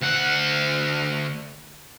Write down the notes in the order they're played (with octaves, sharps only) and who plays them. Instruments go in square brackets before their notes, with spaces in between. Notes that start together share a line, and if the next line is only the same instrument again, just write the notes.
[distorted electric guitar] D2 F#5